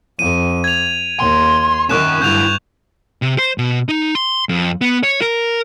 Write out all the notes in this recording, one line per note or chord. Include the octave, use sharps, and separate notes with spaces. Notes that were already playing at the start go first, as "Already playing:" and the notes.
F2 D#7
G#6 F7
D#2 C6
D#3 C#4 A#4 C#6 F#6 E7
G2 D3 E4 G6 F7
C3
C5
B2
D#4
C6
F2
B3
C#5
A#4